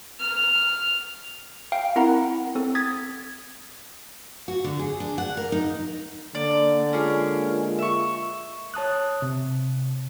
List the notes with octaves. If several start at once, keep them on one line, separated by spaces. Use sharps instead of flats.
F6
F5 G5
C4 E4 A#4 F#5 A#5
C4 A4
D#6 G#6 A6 B6
F#4
D3
G#4
D4
F#5
A#4
D#4
D3 A#3 D5
G#3 A#3 C#4 F4 G#4 A#4
E5 C#6
C#5 A5 D#6 F#6
C3